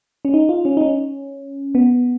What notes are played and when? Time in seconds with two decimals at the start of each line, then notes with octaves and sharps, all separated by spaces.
0.25 C#4
0.34 D#4
0.49 F4
0.65 C#4
0.77 D#4
0.81 C#4
1.75 B3